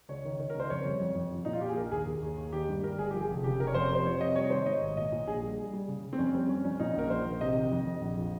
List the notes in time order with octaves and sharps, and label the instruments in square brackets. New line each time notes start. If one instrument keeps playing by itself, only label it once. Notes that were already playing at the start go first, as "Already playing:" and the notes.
[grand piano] C#2 C#5
D#3
D#3
A#4
C#2 C5
F2 C#5
G3
F2
F2
F3
A#2 D#4
F4
F3 G4
G#4
A#1 A#4
D#2 G#4
D#2
D#2
D#2
D#3 G4
G2
G3 A#4
G1 G#4
F3 G4
G#4
F1
C#3 G4
F1 A#4
C#5
F2 C5
C3
C5
F3 C#5
C3 D#5
G3 C#5
D#3 C5
C#5
G#2 D#5
G#1
A#2 D#5
A#2
A#1 G#4
G3
G3
G3
C#3
C#3
C4
F2 C#4
G3 C4
G3 C#4
F2 C#4
A#2 D#4
A#1 A#4
F3 C5
A#1
C3 D#5
D#3
F2
F2
A#1
F3